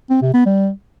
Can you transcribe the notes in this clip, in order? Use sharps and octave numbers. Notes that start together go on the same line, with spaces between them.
C4
C3
B3
G3